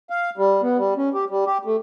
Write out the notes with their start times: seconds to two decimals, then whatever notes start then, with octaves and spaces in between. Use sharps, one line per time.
0.10 F5
0.37 G3
0.62 B3
0.78 G3
0.97 C#4
1.14 G4
1.30 G3
1.47 G4
1.65 A3